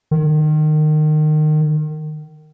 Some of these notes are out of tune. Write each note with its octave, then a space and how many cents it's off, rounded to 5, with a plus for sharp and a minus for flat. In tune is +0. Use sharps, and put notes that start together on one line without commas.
D#3 -25